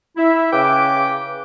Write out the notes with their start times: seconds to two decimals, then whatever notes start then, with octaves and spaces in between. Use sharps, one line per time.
0.17 E4 E5
0.51 C#3 B4 G5 D6